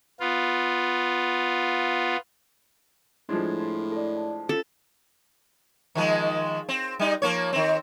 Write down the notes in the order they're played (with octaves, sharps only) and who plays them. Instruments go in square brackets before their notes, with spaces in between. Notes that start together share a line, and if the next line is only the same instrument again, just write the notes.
[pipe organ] B3 F4
[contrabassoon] A2 [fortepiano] F3 G#3 D4 [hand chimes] C6 G#6 A6
[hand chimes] C6
A4 D5
A5
[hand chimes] C#4 F4 [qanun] A4
[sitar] D#3 F3 G#3
C4
G3 D#4
F3 A#3 C#5
D#3 C4